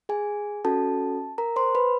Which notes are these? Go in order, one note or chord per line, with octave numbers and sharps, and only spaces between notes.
G#4 G#5
C#4 F#4 A4 A5
A#4 A#5
C5 C6
B4 B5